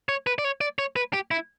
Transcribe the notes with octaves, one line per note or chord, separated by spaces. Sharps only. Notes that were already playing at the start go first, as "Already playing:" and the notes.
C#5
B4
D5
C#5
D5
C#5
B4
G4
E4